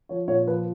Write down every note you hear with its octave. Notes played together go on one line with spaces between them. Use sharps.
F3 C#5
A#2 C#5
F3 B4